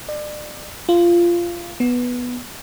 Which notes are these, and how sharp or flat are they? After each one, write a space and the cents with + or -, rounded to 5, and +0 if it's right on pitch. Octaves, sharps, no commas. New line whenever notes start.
D5 +35
F4 -15
B3 -5